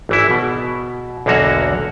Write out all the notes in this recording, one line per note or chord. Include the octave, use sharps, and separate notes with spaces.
G#1 E3 E4
B2
B1 E2 D3 A#3 F#4 C#5